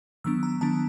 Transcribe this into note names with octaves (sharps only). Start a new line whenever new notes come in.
D#3 F#3 B3 D4 E6
A#5
D#3 F#3 B3 D4 A5